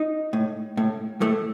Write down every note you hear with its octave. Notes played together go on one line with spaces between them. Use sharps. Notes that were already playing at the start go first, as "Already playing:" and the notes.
Already playing: D#4
A2
A2
A2 A3